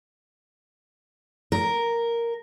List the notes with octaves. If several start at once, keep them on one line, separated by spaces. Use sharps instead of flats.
A#4